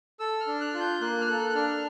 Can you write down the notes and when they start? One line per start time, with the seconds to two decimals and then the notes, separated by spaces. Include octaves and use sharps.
0.20 A4 E6
0.40 F6
0.47 D4
0.61 F#6
0.74 F4
0.80 G6
1.01 A#3 F#6
1.21 F6
1.27 A4 F#6
1.49 F#6
1.55 D4 F6